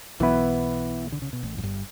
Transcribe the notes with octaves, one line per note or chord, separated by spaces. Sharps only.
B1 B2 E3 B3 E4 B4
D3
C#3
B2
A1 A2
F#2
G1 G2